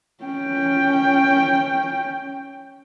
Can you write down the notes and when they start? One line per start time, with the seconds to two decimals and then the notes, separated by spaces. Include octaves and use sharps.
0.24 C#4 G5